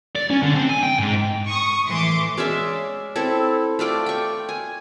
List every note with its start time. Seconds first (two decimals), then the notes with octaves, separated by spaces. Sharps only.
0.16 D5
0.31 C#4
0.42 D3
0.55 C4
0.69 G#5
0.83 G5
1.00 G#2
1.48 C#6 D#6
1.87 A2 E3 C6 D6
2.37 G#3 C#4 D5 E5
3.16 C4 E4 A4
3.79 A3 F4 D5 G5
4.06 G5 C#6
4.49 G#5